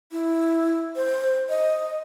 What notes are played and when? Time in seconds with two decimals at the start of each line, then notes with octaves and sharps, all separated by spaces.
0.12 E4
0.96 C5
1.49 D#5